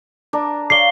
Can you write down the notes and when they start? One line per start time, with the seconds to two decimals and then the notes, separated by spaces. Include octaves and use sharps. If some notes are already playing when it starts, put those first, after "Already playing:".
0.33 D4 A#4
0.70 C#5 D5 F5 C7 G7